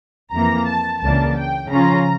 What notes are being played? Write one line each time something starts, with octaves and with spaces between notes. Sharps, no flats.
F2 E3 A#3 A#5
A5
C#2 C#3 E3 A#3 D4 A5
G5
C#3 F3 C#4 F4 A#5